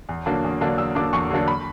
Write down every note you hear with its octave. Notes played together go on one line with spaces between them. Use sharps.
E2
D3 F#3 A#3 D4
E2
D3 F#3 A#3 D4
E2 E6
D3 F#3 A#3 D4 D6
E2 C#6
D3 F#3 A#3 D4
B5